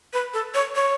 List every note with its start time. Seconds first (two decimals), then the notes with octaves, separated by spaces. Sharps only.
0.13 B4
0.34 A4
0.54 C#5
0.75 C#5